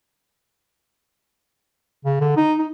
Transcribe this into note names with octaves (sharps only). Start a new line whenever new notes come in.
C#3
D3
D#4
D#4